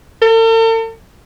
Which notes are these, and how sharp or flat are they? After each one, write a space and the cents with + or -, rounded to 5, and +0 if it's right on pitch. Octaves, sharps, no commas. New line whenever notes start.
A4 +45